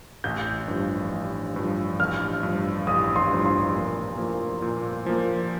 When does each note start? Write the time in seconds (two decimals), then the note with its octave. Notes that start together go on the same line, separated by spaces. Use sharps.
0.24 A1 G6
0.68 G2 F3
1.12 A1
1.56 G2 F3
2.00 A1 F6
2.43 G2 F3
2.87 A1 D#6
3.16 C6
3.31 G2 F3
3.46 C6
3.74 A#2
4.18 F3 A#3
4.62 A#2
5.06 F3 A#3